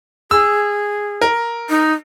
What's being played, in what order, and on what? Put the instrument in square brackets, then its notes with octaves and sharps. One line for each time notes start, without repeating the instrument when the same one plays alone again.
[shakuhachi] G#4 [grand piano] E6
[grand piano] A#4
[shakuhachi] D#4